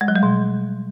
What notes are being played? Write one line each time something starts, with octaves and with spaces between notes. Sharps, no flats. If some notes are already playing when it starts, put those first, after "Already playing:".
G#3
F#3
G3
B2